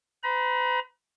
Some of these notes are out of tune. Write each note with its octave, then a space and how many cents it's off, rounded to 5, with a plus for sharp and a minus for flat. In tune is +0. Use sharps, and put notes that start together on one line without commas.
B4 +45 A#5 +45